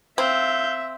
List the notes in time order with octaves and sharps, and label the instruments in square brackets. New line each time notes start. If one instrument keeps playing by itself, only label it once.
[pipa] C4 [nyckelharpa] E5 [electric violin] F5 G6